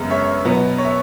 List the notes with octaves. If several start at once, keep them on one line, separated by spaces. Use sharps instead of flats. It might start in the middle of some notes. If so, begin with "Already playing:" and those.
Already playing: F#2 C#3 G#3 B3
C#5 E5
B2 F#3 B3
C#5
E5